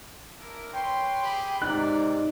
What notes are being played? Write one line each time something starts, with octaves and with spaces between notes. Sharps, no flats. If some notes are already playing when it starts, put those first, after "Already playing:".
D4 E4 A#4
B4 C#5 G5 C6
G4 G#4 B5
G#2 C3 D#4 D5 F#6